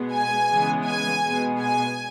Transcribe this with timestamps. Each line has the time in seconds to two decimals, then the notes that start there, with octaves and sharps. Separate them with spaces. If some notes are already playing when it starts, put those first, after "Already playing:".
Already playing: B2 G#3 B3
0.13 G#5
0.50 C#3 E3 G#3 B3
0.86 G#5
1.23 B2 G#3 B3
1.60 G#5